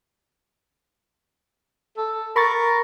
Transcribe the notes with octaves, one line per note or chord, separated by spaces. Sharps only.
A4
A#4 B5 C#6 A6